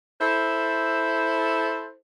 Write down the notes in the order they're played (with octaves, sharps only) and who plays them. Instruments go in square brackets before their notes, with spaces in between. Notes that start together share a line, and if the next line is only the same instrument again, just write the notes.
[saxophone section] E4 A4 C5